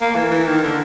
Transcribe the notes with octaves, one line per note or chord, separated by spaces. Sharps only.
A#3
E3
E3
D#3
D3